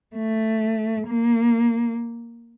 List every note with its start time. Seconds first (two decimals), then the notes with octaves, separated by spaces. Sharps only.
0.16 A3
1.08 A#3